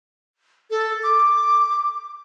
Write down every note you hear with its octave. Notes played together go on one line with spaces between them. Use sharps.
A4
D6